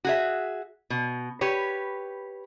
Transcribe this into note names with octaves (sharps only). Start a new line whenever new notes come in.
F#4 G#4 E5
B2
G4 B4 C#5